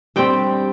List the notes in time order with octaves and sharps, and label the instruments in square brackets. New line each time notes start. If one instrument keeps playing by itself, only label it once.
[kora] G2 G3 C4 G5